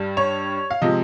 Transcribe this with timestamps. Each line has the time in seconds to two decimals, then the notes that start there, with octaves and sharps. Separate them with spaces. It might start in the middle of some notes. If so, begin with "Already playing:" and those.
Already playing: G2 G3
0.17 C#5
0.71 F5
0.82 C3 F3 G#3 D#5